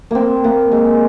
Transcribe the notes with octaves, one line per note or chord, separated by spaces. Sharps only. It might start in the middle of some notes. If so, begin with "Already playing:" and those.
A#3 C4
A#3
G#3